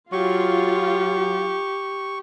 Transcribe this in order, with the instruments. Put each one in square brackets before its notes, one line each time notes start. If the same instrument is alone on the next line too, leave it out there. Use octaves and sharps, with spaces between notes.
[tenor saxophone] F#3 [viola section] F4 [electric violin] G4 [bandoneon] C#6